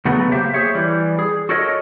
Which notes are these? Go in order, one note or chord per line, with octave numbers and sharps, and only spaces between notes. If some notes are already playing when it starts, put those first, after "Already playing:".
C#3 F#3 A3 B3
A#3 G4 C5 E5
G#4 C5 C#5 E5
E3 G3
G#4
F#4 A4 A#4 C#5 D#5